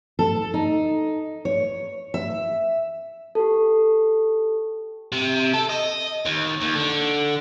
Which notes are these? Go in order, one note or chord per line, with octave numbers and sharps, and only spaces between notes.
A4
D#4
C#5
E5
G4 A4
C3
A4
D#5
D#2
D#2
D3